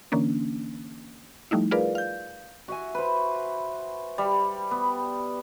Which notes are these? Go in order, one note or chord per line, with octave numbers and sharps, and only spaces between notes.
D3 E3 A#3 C#4 D4
F3 G3 A3 D#4 E4
F4 G#4 A#4 B4 D5 F5
F5 G6
F#4 E5 G#5
B4 C5
G3
B3